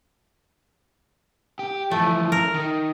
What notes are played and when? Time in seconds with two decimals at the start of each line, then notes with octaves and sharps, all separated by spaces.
1.59 G4
1.91 E3 F3 A3
2.32 A#4
2.54 D#3